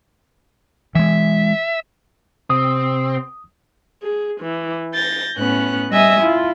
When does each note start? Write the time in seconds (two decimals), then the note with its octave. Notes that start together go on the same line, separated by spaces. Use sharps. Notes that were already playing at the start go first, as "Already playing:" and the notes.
0.95 E3 G#3 E5
2.50 C3 C4 D#6
4.02 G#4
4.40 E3
4.93 G6 A6 A#6
5.38 A2 B3 C#4 F#6
5.90 G3 D#5 E5 G#5 D#6
6.21 E4 F4